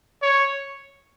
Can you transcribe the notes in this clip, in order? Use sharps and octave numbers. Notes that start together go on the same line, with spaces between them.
C#5